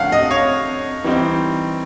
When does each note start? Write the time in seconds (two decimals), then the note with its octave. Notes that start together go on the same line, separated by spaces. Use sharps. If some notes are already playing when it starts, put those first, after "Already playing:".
Already playing: D3 F3 A3 C#4 F5 F#5
0.12 D#5
0.31 C#5
1.04 E3 G3 C4 D#4